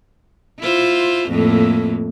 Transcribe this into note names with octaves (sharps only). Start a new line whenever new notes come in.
E4 F4 C5
F2 A2 A#3